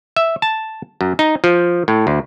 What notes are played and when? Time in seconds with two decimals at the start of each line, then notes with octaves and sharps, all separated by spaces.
0.16 E5
0.42 A5
1.01 F#2
1.19 D#4
1.44 F3
1.88 A2
2.07 D2